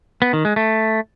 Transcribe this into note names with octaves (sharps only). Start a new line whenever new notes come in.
B3
D#3
G#3
A3